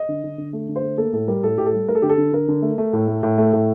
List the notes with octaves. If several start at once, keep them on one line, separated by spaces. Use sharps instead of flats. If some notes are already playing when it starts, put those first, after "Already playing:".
Already playing: D#5
D3
D3
D3
A3
D3
C5
A3
A#3 A4
A2 A4
G3 A#4
A2 A4
A2 G4
A4
G3
A3 A#4
A4
D3 G4
A4
D3
D3 A#4
D3
A3
A3
A2
A3
A2
A3
A2